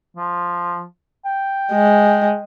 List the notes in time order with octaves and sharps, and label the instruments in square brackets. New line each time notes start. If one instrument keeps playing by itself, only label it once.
[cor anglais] F3
G5
[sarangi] G#3